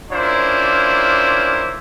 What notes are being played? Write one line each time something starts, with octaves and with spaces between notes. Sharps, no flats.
A#3 C#4 D4 E4 F4 C5